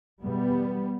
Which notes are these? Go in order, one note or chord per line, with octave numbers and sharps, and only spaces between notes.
E2 B2 G3 B3